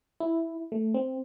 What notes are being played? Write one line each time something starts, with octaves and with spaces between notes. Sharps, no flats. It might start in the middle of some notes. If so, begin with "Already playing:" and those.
E4
A3
C4